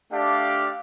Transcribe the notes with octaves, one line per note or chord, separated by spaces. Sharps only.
A3 D4 G4 D5 F5